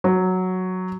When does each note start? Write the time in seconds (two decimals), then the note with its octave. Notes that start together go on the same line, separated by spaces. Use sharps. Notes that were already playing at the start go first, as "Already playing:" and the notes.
0.04 F#3